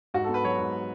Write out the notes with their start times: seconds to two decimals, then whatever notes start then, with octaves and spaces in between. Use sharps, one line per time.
0.14 G#2 F#4
0.24 A4
0.29 B3
0.34 B4
0.44 F#3 C#5
0.59 G#2